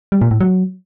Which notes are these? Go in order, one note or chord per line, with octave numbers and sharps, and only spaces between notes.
G3
A#2
A2
F#3